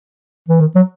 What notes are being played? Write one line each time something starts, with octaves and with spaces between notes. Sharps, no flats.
E3
D#3
F#3